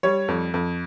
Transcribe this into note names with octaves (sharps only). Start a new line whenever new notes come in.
G3 C#5
F2
F2